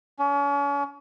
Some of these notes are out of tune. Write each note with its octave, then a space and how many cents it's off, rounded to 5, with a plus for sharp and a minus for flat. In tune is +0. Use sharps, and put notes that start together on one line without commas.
C#4 +35